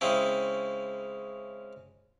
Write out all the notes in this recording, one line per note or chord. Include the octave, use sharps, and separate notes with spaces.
C#3 G#3 C4 C#4 E4